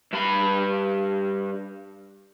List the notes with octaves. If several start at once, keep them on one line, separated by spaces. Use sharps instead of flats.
G2 B5